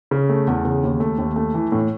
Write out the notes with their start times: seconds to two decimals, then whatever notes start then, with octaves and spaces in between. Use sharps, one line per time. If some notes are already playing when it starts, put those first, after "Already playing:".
0.11 C#3
0.29 A3
0.47 E2
0.65 C#3
0.83 D#2
1.00 A3
1.18 D#2
1.36 A3
1.54 E3
1.72 A2